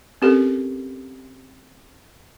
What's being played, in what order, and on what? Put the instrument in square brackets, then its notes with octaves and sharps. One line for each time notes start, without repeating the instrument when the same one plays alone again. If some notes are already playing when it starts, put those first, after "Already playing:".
[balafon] C4 C#4 G4 A4 A#4